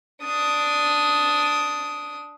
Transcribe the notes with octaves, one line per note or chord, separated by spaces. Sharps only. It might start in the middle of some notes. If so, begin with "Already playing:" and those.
D4 D#6